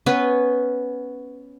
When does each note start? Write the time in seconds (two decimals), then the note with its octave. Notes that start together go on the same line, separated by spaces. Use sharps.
0.06 B3 C#4 B4 G#5